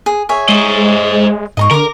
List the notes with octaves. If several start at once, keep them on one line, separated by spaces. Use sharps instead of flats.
G#4
G#4 C#5 E5
G#3 C5 D#5
G#2 D#5 A#5 C#6
D3 A#4 A#5 D6